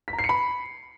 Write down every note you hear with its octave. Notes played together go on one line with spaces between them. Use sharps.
B6
A#5
C7
C#7
B5